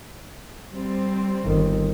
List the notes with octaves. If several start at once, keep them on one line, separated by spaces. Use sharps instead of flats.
G3 C4
G1 D#3